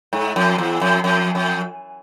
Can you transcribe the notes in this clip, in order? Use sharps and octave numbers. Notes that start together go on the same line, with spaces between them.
G#2
F2
E2
F2
F2
F2